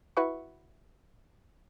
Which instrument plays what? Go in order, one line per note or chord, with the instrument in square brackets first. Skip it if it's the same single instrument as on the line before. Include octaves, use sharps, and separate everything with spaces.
[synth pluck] E4 F#4 B4 F#5 C#6